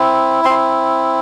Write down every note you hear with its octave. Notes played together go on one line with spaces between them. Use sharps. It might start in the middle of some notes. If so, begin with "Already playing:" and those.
Already playing: C4 E4
C4 E4 C6